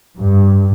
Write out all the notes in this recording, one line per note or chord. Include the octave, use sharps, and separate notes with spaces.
G2